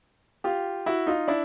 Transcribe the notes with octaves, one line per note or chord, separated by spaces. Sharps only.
F4 G4
E4 F#4
D#4 F4
D4 E4